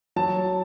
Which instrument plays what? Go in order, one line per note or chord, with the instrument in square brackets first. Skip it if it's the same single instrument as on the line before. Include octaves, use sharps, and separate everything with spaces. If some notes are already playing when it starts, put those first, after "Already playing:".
[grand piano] F#3 A5